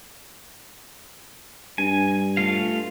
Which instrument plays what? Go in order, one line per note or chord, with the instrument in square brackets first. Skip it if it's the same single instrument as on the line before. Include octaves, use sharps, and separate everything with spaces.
[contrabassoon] G2 [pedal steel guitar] G#5
[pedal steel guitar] A3 F4 F5